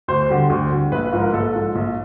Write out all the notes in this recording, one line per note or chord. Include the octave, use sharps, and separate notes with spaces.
D2 C5
D3 G3
D2
D3 G3
A#1 B4
B4
G#2 F3
A#4
A#1 A4
G#2 F3
A#1